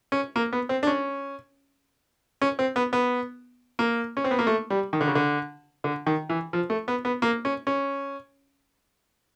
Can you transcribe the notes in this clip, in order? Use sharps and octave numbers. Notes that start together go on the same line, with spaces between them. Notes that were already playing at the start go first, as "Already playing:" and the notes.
C#4
A#3
B3
C4
D4
C#4
C#4
C4
B3
B3
A#3
C#4
C4
B3
A#3
A3
G3
D#3
D3
C#3
D3
D3
D#3
E3
F3
A3
B3
B3
A#3
C#4
C#4